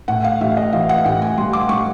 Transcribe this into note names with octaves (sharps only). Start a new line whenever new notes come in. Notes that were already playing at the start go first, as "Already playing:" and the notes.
A2 F#5
F5
A1 E5
D#5
E3 F5
F#5
A1 G5
G#5
G3 C6
D6
G3 C#6